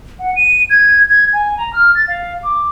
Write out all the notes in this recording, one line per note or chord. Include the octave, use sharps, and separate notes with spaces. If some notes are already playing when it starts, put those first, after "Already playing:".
F#5
D#7
G#6
G#6
G#5
A#5
F6
A6
F5
D6